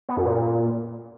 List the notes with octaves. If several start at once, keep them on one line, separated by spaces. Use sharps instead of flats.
B3
F#2
A#2